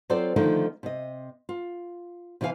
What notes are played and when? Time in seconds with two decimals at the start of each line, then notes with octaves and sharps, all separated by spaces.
0.10 F#3 C4 F4 A4 C5 D5
0.36 D3 D#3 F3 A3 A#3 D#4
0.83 C3 D#5
1.49 F4
2.41 C3 E3 E4 A#4 F5 G#5